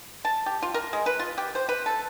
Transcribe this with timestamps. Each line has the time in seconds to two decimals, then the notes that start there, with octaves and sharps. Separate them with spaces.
0.25 A5
0.46 G4
0.62 F4
0.74 A#4
0.93 G#3
1.06 B4
1.19 F4
1.38 G4
1.55 C5
1.69 B4
1.86 A4